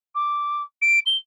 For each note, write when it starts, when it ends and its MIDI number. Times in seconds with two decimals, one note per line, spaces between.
0.15 0.62 86
0.82 0.99 98
1.06 1.17 103